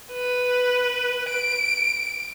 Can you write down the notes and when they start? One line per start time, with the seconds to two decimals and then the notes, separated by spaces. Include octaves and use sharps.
0.12 B4
1.30 D7